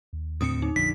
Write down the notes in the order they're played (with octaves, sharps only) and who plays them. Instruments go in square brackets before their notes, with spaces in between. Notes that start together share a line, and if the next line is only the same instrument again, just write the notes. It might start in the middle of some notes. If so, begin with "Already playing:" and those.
[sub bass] D#2
[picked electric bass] D2 A2 C4 [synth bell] D#6 C#7
[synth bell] D#4
[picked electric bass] A#1 F2 D3 [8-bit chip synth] B6